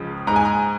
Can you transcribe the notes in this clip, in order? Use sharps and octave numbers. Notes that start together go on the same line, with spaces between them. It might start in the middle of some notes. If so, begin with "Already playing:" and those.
Already playing: C#2 C#3 F3 G#3
G#2 G#3 A#5
G#5
A#5